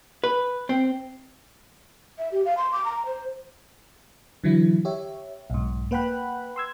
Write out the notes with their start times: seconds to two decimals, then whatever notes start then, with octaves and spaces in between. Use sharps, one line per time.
0.24 B4
0.69 C4
2.18 E5
2.32 G4
2.45 F5
2.57 C6
2.72 D6
2.85 A#5
3.06 C5
4.44 D3 E3 F#3 E4
4.85 G4 C#5 E5
5.50 B1 G#2
5.91 A#3 B4 F#5 G5 B5 F#6
6.56 C6 E6 G#6